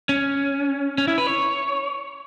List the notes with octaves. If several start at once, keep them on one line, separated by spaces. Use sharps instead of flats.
C#4
C#4
E4
B4
C#5